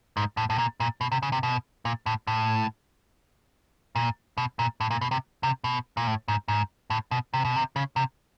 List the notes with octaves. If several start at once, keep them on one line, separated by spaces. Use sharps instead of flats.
G#2
A2
A2
A#2
A#2
B2
C3
C#3
C3
B2
A#2
A2
A2
A#2
B2
A#2
A2
A#2
B2
C3
C3
B2
A#2
A2
G#2
G#2
A2
B2
C3
B2
C3
C#3
C3